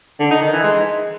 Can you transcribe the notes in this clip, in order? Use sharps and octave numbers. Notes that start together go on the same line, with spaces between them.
D3
D#4
D#3
E3
G#3